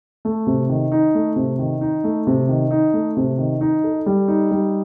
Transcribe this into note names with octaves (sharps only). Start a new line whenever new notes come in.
A3
C3
D#3
D#4
A3
C3
D#3
D#4
A3
C3
D#3
D#4
A3
C3
D#3
D#4
A4
G3
D#4
G3